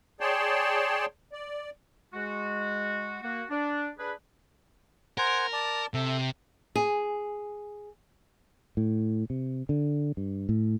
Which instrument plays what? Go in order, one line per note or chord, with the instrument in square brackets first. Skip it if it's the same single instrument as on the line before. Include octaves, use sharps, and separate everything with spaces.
[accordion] G#4 C#5 D5 G5 A5 C6
D5
[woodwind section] G#3 F#4
A#3 F#4
D4
D4 G#4 B4
[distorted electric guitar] A#4 [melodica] C5 F#5 G#5
[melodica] D5 A5
[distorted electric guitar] C3 [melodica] A4 E5
[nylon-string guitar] G#4
[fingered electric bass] A2
C3
D3
G2
A2